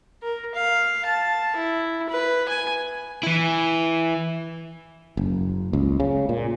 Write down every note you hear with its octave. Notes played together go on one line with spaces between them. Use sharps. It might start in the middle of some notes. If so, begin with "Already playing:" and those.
A#4
F5
A5
E4
B4
G#5
E3 E4
F#1
C#2
C#3
A#2